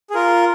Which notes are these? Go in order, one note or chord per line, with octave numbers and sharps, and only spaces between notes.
G#4
F4 A#4